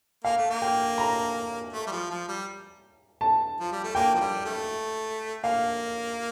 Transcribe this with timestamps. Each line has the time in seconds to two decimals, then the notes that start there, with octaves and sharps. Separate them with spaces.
0.24 A#3 F5
0.37 A3
0.50 A#3
0.62 G5
0.98 A#5
1.73 A3
1.87 G3
1.91 F3
2.10 F3
2.28 G3
3.21 A5
3.60 F3
3.72 G3
3.84 A3
3.95 A#3 G5
4.15 F3
4.20 G3
4.45 A3
5.44 A#3 F5